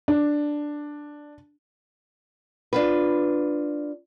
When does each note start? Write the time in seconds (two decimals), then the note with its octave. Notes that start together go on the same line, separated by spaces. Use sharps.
0.08 D4
2.73 D4 F4 B4